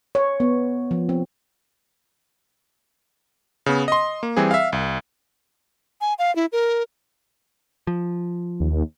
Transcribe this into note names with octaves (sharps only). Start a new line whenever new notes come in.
C#5
B3
F3
C4
C#3 B3
D#5 C6
A#3
E3 G3 C4 G#4
E5 F5
C2
G#5
F5
E4
A#4
F3
D#2